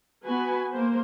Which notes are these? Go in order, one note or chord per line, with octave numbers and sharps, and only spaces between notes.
B3 F#4 B4 G#5
A#3 C5